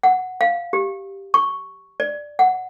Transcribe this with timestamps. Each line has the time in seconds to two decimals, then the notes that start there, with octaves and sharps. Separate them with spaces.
0.03 F#5
0.41 F5
0.73 G4
1.34 C#6
2.00 D5
2.39 F#5